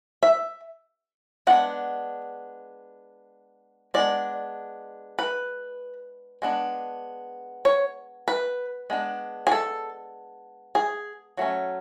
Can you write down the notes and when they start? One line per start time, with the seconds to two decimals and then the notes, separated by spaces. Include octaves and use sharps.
0.23 E5
1.47 G#3 B3 D4 F#5
3.94 G#3 B3 D4 D5
5.19 B4
6.42 G#3 B3 D4
7.65 C#5
8.28 B4
8.90 G#3 B3 D4
9.47 G#4
9.52 A4
10.75 G#4
11.37 F#3 A3 C#4